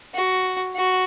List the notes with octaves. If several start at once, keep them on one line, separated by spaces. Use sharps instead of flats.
F#4
F#4